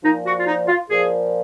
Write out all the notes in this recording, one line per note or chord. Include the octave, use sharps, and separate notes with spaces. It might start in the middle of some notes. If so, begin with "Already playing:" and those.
A#2 F3 D#4
F#4
F4
D#4
F4
A#2 F3 G#4